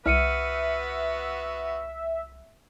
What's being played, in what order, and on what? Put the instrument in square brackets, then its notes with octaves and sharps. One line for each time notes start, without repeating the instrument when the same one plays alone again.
[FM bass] C2 [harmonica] B3 F#4 B4 [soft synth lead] E5 [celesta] F6 C#7 D#7